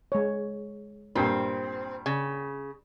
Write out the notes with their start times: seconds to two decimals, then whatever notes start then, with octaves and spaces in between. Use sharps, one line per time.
0.12 G#3 C#5
1.15 G2 A#2 C4
2.06 C#3